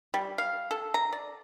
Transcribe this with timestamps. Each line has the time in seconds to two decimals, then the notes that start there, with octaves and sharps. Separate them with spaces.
0.14 G3
0.38 F5
0.71 A4
0.94 A#5
1.13 D5